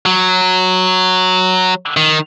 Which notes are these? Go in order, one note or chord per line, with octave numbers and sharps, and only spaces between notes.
F#3
D#3